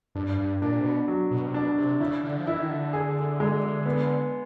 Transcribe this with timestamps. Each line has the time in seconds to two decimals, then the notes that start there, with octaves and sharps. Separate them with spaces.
0.15 G2 D4
0.38 G2
0.62 A#2 D4
0.79 C3
0.84 B2
1.08 F#3
1.31 B2
1.47 C3
1.54 B2 D4
1.77 C3
2.00 C#3 E4
2.24 D3
2.38 F3
2.47 E3 E4
2.60 D#3
2.70 D3
2.93 G#4
3.40 G#3
3.86 B3